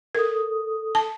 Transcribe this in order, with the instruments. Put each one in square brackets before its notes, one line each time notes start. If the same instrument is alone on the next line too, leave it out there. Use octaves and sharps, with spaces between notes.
[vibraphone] A4 D#6 [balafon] A#4
[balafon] A5